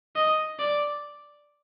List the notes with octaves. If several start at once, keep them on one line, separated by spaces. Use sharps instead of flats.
D#5
D5